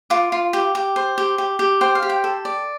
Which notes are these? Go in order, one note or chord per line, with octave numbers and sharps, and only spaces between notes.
F4 D6
F4
G4
G4
C5
G4
G4
G4
C5 G5
F5
G4
G5
A4
D5